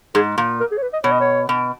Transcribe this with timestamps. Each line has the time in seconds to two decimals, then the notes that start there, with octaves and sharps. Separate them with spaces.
0.15 G#2 G#4
0.38 A#2
0.60 A#4
0.72 G#4
0.78 C#5
0.82 B4
0.93 D#5
1.04 B2 C#5
1.12 D#5
1.20 C#5
1.49 B2